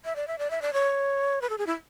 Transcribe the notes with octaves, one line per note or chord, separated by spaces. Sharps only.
E5
D5
E5
D5
E5
D5
C#5
B4
A4
G#4
E4